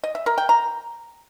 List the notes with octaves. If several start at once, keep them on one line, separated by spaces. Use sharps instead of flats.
D#5
E5
A#4
G5
A#5